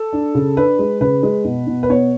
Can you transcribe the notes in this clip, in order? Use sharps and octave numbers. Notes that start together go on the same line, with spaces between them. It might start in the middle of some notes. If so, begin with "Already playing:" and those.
Already playing: A4
D4
C#3
D4 B4
G#3
C#3 B4
G#3
B2
B2
B4
B3 C#5